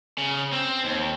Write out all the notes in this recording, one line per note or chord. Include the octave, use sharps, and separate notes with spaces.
C#3
C4
D#2